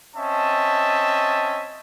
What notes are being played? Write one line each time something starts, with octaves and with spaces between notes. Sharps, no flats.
C4 C#4 D#5 E5 A5